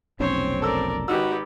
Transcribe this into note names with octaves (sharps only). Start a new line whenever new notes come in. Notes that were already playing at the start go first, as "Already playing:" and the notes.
F1 B1 C4 C#4 C5 C#5
A4 A#4 D5 E6
G#1 D#4 F#4 G4 B4 E6